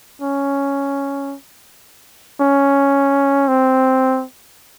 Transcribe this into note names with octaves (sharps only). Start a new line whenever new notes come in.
C#4
C#4
C4